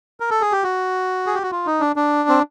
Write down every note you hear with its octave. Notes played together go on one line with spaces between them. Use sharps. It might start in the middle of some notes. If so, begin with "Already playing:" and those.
A#4
A4
G#4
G4
F#4
G#4
G4
F#4
F4
D#4
D4
D4
C4